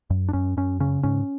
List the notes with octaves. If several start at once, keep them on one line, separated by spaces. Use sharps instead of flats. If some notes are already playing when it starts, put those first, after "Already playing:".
F#2
D4
F#2 C#4
F#2 C#4
C#3 C#4
G#2 C#4